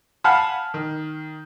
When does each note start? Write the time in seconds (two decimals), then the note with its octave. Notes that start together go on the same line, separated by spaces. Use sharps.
0.24 F5 F#5 G#5 A5 B5 F6
0.74 D#3